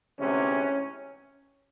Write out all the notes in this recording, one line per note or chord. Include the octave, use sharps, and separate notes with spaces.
D2 C3 E3 G#3 C#4